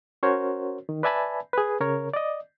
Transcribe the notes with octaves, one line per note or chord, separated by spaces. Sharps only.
C#4 F#4 A#4 C5 C#5
D#3
B4 D5 E5 G#5 A5 B5
G#4 B4
C#3 A#4 C#5
D5 D#5